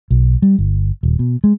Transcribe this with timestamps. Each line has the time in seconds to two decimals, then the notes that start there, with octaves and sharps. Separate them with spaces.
0.11 B1
0.42 G3
0.58 G1
1.03 D#1
1.19 B2
1.44 G#3